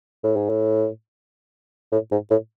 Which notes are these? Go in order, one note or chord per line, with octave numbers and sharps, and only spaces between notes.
A2
G#2
A2
A2
G#2
A2